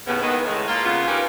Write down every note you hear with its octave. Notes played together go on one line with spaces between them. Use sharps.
D#2 A2 C#3 B3
D#3 E3 G#3 B3
A2 C#3 G#3
A#3 F4 A4
C#3 B3 F4
C#4 D#4 G4 G#4 A#4 B4